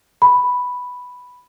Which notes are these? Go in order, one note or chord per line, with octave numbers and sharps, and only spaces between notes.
B5